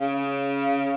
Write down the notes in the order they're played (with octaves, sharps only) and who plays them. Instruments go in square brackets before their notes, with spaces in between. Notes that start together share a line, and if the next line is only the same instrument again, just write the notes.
[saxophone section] C#3